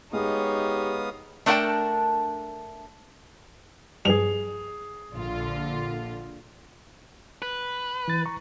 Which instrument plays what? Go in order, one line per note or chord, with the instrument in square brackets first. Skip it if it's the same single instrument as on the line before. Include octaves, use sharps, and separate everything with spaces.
[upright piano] G#3 [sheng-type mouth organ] B3 F5 D#6 [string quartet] D#4 C#5 [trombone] G4
[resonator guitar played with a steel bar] A3 D4 A#4 F#5 G5 A5
[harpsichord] G2 F3 [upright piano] G#4 F7
[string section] A#1 D3 F4
[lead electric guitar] B4
[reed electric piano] E3 A6
A#5 C#6